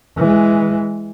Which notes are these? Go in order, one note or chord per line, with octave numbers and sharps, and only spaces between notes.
E3 G#3